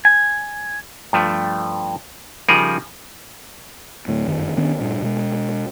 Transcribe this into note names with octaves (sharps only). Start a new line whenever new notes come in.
G#5
G2 F3 A3
C#3 F3 G3 D#4 G#4 A#4
D2 A2
G1 F#2 D#3
D#3 B3 C#4 D4
G2 A#2
B2 G#3